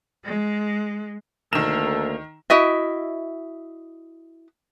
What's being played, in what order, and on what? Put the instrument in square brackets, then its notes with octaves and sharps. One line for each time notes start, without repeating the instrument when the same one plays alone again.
[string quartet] G#3
[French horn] D2 [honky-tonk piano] D#3 E7 [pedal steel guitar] A#3 A#4 [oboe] A4
[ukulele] E4 F#4 D#5 E5